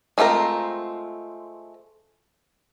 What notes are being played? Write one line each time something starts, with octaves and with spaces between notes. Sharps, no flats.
G#3 A3 C4 F4 A#4